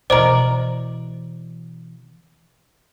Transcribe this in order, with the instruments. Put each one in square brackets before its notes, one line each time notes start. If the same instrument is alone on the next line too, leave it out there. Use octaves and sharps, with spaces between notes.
[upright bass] B2 E3 [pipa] A#4 D5 [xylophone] C5 D#5